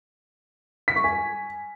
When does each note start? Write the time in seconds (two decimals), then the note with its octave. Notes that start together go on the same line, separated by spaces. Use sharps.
0.88 B6
0.96 C#6
1.04 G#5